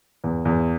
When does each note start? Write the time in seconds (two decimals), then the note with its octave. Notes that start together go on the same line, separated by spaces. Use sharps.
0.24 E2
0.45 E2